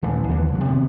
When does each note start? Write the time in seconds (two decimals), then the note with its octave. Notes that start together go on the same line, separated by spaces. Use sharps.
0.02 D#1 A1 E3
0.28 D#2 D3 E3 F3
0.52 C2 F2 F#3
0.64 C3 D#3 B3